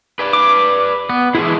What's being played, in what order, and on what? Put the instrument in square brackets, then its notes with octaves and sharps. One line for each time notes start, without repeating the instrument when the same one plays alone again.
[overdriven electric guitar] B4 D5
[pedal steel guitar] D6
B3
[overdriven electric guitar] A2 G#3 [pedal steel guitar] E3 E4